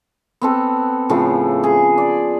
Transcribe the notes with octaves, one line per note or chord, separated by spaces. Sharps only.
B3 C4 A4
A2 C#3 F3 A3
G#4 G#5
D5